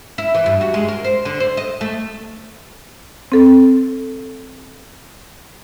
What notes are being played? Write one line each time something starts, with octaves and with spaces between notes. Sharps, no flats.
E4
E3
G2
F#4
G#3
A#4
C5
D3
C5
D#5
A3
C4 A4